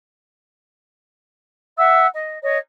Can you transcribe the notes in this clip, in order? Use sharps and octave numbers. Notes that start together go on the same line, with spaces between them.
E5 F#5 E6
D#5
C#5 D#5